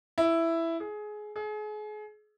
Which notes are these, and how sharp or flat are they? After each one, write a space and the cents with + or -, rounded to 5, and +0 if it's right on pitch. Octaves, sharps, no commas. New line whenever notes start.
E4 +5
G#4 +20
G#4 +35